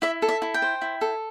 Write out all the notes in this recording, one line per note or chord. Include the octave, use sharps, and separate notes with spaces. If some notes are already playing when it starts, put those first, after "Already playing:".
E4 E5
A4
E5
E4
G5
C5
E4
A4